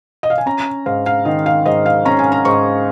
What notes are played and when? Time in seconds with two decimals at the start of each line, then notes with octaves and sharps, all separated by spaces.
0.23 D#5
0.30 F5
0.38 G#5
0.46 C#4 A#5
0.86 G#2 F5
1.06 F5
1.25 D#3 D#5
1.46 F5
1.66 G#2 D#5
1.86 F5
2.05 C#4 A#5
2.19 G#5
2.32 A#5
2.45 G#2 C#6